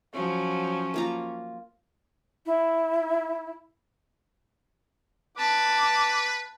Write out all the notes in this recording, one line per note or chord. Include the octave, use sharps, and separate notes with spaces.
F3 F#3 C#4
A#3 F4 A#5
E4
B4 A5 D6